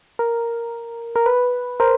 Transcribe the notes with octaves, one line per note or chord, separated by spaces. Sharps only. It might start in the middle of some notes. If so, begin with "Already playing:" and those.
A#4
A#4
B4
A#4 C5